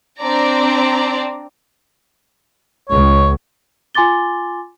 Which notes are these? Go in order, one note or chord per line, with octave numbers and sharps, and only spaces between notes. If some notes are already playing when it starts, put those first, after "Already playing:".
C4 D4 D5 A#5
C#2 C#5
F4 G#5 C6 D6 A6 G7